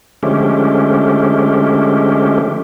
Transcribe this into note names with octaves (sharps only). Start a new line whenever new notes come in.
D3 F3 G#3 A3 C#4 G4